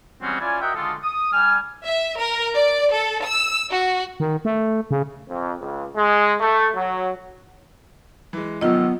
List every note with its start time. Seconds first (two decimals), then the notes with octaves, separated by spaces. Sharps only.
0.22 E3 G3 G#3 C4 C#4 F#4
0.40 C#4 E4 F4 D5 G#5
0.61 F#4 A#4 D#5 E5 F#5 G5
0.75 D3 D#3 G#3 F4 A4
1.03 D#6
1.32 G3 G#5 F6
1.84 E5
2.19 A#4
2.55 D5
2.93 A4
3.26 E6
3.71 F#4
4.20 D#3
4.45 A3
4.91 C#3
5.28 F2
5.60 C#2
5.96 G#3
6.40 A3
6.75 F#3
8.33 E3 G#3
8.61 F1 D#3 F#3 B3 F4 D#5 E6